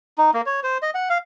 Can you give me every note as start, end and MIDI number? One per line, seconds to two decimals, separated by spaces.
0.18 0.31 63
0.34 0.41 58
0.46 0.60 73
0.63 0.78 72
0.82 0.90 75
0.95 1.09 78
1.10 1.18 77